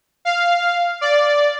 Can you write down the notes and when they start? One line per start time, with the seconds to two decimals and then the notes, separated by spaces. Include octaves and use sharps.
0.25 F5
1.01 D5